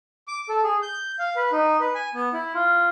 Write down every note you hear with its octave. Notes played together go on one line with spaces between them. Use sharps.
D6
A4
G#4
G6
F5
B4
D#4
B4
G#5
B3
E4
F4